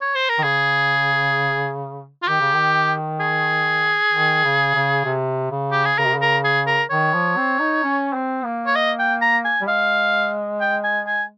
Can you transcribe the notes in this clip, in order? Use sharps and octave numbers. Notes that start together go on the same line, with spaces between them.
C#5
C5
A#4
D#3
C#3 G#4
F4
D#3 G4
C#3
D#3
G#4
D#3
C#3
C#3
C3
C#3
G4
G#4
C#3 A#4
C3
C#3
A#4
G#4
A#4
D#3 C#5
F3
C4
D#4
C#4
C4
A#3
C#5
D#5
G5
A#5
G#5
G3
G#3 F5
G5
G#5
G#5